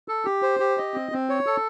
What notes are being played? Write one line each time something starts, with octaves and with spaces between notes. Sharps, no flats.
A4
G4
C5
G4
D#5
C4
C4
C#5
A4